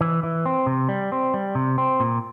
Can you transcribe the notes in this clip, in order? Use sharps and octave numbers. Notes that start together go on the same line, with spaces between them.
E3
E3
C4
C3
G3
C4
G3
C3
C4
A#2